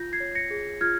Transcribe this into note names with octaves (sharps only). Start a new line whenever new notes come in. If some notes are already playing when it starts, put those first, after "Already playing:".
Already playing: F4 G6 A#6
G#6 C7
C#5
A#6 C#7
G#4
F4 F6 G#6